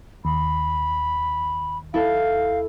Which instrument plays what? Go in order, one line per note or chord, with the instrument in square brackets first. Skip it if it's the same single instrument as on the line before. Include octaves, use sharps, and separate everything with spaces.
[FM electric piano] D#2 [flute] B5
[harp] E4 A4 [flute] F5